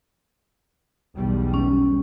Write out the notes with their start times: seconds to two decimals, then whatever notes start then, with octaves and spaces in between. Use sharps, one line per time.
1.16 B1 E2 G3
1.54 C#4